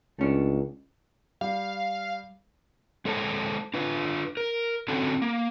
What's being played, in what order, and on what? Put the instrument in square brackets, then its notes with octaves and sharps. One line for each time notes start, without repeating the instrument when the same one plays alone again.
[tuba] C#2 [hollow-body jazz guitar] A3 C#4 D4
[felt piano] G3 [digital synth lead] F5
[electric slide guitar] G#3 A4 C5 C#5 A5
D4 F4 B4
A#4
D3 C4 C#4 F#4 A4 A5
A#3